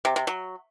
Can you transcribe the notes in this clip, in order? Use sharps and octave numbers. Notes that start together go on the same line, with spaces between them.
C3
C3
F#3